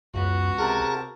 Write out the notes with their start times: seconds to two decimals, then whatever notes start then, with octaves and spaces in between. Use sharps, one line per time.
0.14 C#2 F#2 B3 F#4
0.58 C3 G#4 A#4 F#5 A5 A#5